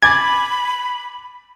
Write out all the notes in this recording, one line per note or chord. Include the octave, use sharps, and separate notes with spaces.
G#5 B5 D6 G#6 A6